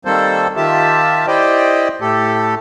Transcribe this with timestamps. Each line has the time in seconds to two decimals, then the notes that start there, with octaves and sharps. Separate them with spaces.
0.05 D#3 G3 A#3 C4 A4 C5
0.56 D#3 F4 G4 E5 A5
1.27 E4 G4 C5 D5 D#5 G5
2.01 A2 A3 G4 A4